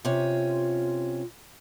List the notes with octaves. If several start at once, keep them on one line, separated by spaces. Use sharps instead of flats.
C3 C#4 F4